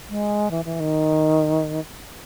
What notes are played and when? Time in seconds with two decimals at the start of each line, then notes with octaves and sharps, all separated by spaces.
0.10 G#3
0.51 E3
0.65 E3
0.80 D#3